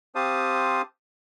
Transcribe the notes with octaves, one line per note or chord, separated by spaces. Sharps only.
C4 G4 C5 F5 A5 D#6